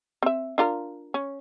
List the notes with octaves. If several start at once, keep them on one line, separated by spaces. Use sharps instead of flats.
C4 E5
D4 F4 A#4
C#4